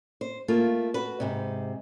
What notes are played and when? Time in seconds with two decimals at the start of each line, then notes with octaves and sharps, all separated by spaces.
0.21 C5
0.48 A3 A#3 F4
0.94 F#4 B4
1.20 G#2 C3